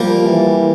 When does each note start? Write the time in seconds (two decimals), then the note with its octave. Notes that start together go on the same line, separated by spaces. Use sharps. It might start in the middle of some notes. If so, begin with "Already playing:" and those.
Already playing: F3 G3 A#3
0.26 E3